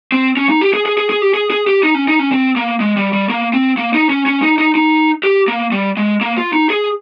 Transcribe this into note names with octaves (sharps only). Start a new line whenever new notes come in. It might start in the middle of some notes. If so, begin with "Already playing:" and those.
C4
C#4
D#4
G4
G#4
G#4
G#4
G#4
G4
G#4
G#4
G4
D#4
C#4
D#4
C#4
C4
A#3
G#3
G3
G3
A#3
C4
A#3
D#4
C#4
C#4
D#4
D#4
D#4
G4
A#3
G3
G#3
A#3
F4
D#4
G#4